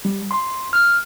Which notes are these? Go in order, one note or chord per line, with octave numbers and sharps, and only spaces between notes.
G3
C6
F6